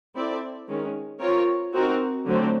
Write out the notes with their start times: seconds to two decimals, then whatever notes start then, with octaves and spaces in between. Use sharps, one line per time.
0.15 C4 E4 A4 D5
0.68 D#3 G#3 C#4
1.20 C4 F4 A#4 C#5
1.73 C4 D#4 F#4 A#4
2.26 D3 F#3 A3 C4